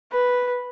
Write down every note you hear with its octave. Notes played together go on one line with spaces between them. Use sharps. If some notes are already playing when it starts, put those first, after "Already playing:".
B4